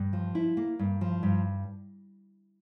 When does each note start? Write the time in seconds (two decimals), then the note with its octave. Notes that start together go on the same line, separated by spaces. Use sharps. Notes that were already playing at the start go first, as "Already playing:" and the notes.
Already playing: G2
0.13 F3
0.35 E4
0.57 A#3
0.79 G2
1.01 F3
1.23 G2